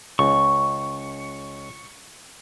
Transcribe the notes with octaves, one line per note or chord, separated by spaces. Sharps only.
C#2 C#6